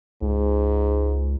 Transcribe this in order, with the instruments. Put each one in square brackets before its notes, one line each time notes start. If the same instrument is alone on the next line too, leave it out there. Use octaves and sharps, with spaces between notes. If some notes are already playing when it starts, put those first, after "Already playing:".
[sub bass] C#2 [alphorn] G#2